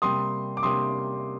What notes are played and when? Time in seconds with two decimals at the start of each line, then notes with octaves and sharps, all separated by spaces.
0.02 C3 G3 A#3 C6 D#6
0.57 D6
0.63 C3 G3 A#3 C6 D#6